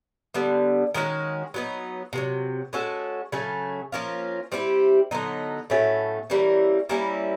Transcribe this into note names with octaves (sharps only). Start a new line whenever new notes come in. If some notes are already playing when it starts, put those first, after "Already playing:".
D3 G3 B3
D#3 G#3 C#4 F#4
F#3 B3 D#4
C3 D#3 F#3
G#3 C#4 F#4 A4
C#3 F#3 A3 C#4
F3 A#3 C#4 F4
G3 C4 E4 G4
D3 F#3 B3 D#4
A2 F#3 A3 C#4
E3 G3 A#3 C#4
G3 A#3 C#4 E4